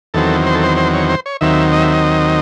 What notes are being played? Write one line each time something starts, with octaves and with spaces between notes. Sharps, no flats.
E2 D#3 F#3 C4 A4
C5
A4
C5
C5
C#5
C5
C#5
D#2 D#3 F#3 C4 E5
D#5
E5
D#5